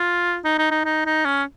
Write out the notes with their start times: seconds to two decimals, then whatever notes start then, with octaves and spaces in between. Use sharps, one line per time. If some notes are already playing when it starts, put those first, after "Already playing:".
Already playing: F4
0.44 D#4
0.58 D#4
0.70 D#4
0.84 D#4
1.06 D#4
1.25 C#4